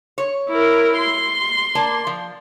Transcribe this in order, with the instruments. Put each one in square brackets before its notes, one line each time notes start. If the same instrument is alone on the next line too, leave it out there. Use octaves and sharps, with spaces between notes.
[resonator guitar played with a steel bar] C#5
[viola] E4 A#4
C6
[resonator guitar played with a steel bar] A#3 D5 A5
F3